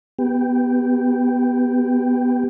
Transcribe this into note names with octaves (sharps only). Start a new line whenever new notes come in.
B3 G4